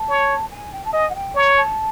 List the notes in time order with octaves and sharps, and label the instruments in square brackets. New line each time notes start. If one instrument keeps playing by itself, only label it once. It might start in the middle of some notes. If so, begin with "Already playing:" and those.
Already playing: [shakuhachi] A5
[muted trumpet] C#5
[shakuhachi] G#5
G5
A5
[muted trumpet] D#5 [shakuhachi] G#5
[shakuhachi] F#5
G5
[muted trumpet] C#5 [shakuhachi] A#5
[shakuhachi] A5